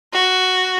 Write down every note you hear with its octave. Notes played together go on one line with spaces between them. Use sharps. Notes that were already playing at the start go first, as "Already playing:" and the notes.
F#4